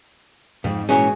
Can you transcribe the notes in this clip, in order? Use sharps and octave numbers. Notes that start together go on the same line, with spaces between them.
F2 G#2
A#2 E3 C#4 F#4 G#4